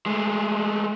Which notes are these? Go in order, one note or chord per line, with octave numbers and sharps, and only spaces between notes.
G#3 A3